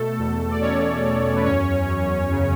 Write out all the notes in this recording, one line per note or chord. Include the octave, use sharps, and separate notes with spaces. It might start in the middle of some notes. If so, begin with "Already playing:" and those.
Already playing: B2 A3 A4
E2
D5
B2 C#4 C#5
E2
B4
F#2 C#4 C#5
F#2
C#3